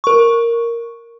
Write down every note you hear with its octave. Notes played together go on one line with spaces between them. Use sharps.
A#4 C#6